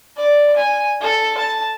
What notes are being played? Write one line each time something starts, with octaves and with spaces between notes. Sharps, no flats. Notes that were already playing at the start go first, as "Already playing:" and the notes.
D5
G#5
A4
A5